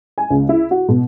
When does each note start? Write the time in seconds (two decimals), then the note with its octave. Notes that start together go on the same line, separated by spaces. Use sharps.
0.18 G#5
0.30 C#2
0.49 E4
0.71 F#4
0.89 B2